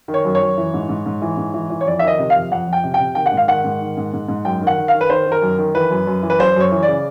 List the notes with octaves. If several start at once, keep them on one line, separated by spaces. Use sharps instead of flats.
D#3
C#5
F#2
C#5
F#2
E3
G#2
G#2
G#2
E3
G#2
E3
E3
C#5
F2 D5
D#3 E5
D#5
C3
F2 F5
F2 F#5
F2
G5
C3
G5
C3
D#3 G5
F#5
G#2
F5
D#3 F#5
G#2
D#3
G#2
G#2
G#2
F#2 G5
D#3
F#5
D#3
F5
D#3
B4
D#3 C5
D#3
A#4
F#2
D#3
E3 B4
F#2
F#2
E3
B4
F#2 C5
F#2 C#5
E3
C#3 D5